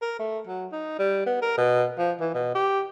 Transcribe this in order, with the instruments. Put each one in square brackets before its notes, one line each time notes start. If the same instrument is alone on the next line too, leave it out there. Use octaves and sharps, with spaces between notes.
[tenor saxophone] A#4
A3
F#3
D#4
G3
B3
A#4
B2
F3
E3
B2
G4